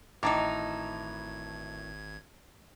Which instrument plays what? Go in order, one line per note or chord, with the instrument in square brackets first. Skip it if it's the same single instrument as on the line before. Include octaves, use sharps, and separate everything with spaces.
[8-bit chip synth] G#1 G#6 [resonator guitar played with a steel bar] A2 E3 D#4 [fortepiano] A5 A#5 D6